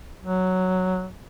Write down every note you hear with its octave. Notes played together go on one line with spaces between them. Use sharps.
F#3